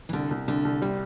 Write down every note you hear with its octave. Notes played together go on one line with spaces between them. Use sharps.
E3
C2 D3
C2
C2 D3
C2
C3 G3